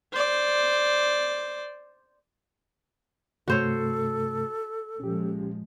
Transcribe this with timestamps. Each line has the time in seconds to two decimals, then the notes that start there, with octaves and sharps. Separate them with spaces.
0.13 C5 D5
3.48 G2 C3 A3 F#4 A4 C5 C#5
5.00 A#2 F3 G#3 C#4 G4